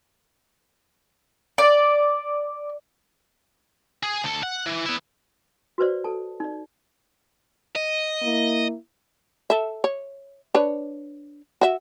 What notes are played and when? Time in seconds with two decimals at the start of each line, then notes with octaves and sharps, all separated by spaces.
1.58 D5
4.03 G#4
4.24 D2 A4
4.43 F#5
4.66 E3
4.85 B3 E4
5.78 F#4 B4 C5 D5
6.04 A4 A5
6.40 D#4 D5
7.76 D#5
8.23 A#3 E4
9.50 A4 E5
9.84 C#5
10.55 D4 B4 C#5
11.61 F#4 E5